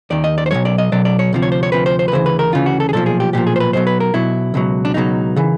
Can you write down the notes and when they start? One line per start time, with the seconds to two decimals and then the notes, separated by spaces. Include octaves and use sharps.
0.10 D#2 D#3 D5
0.24 D#5
0.38 D5
0.46 C5
0.51 B1 B2 F#3 C#5
0.65 D5
0.78 D#5
0.92 B1 B2 F#3 D5
1.05 D5
1.19 C#5
1.33 D2 C3 F3
1.42 C#5
1.52 C5
1.63 C#5
1.72 D2 C3 F3 B4
1.86 C5
1.99 C5
2.08 B4
2.12 D2 C#3 E3 C5
2.26 B4
2.39 A#4
2.52 D2 C#3 E3 F4
2.66 F#4
2.80 A4
2.89 G#4
2.93 B1 A#2 F3 A4
3.06 G#4
3.20 G4
3.33 B1 A#2 F3 G4
3.47 G#4
3.56 C5
3.60 B4
3.73 B1 B2 F#3 C5
3.87 B4
4.00 A#4
4.14 B1 B2 F#3 E4
4.54 C#2 B2 F#3
4.85 D4
4.94 C#2 B2 F#3 D#4
5.36 C#3 E3